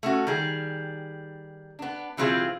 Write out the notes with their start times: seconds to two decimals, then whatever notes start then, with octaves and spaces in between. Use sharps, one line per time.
0.03 A3 C#4 F#4
0.27 D#3 G3 G#4
1.79 B3 D4
2.17 B2 E3 G3 C4 F4 G#4